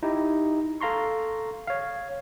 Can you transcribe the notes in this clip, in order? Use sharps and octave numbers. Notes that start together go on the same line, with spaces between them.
D#4 E4 G4
A4 F5 A#5 C6 C#6
C#5 F5